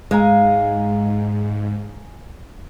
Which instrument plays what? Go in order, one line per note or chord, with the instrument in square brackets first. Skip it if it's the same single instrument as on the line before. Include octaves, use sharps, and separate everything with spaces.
[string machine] G#2 [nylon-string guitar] G#3 [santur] F5 G#5 A#5